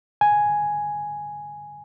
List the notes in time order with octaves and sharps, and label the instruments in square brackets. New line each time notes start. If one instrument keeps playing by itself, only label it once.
[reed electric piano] G#5